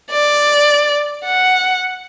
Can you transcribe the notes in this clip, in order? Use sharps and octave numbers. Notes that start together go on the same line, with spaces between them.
D5
F#5